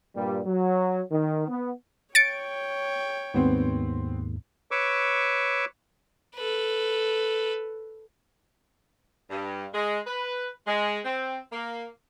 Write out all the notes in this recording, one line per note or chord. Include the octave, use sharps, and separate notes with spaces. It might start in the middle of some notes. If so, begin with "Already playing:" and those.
G2 A#2 G3
F#3
D#3
B3
C#5 G5 A6 C#7 D7
D#2 G#2 B3 C4
B4 C#5 C#6 D6 E6
A4 B4
G2
G#3
B4
G#3
C4
A#3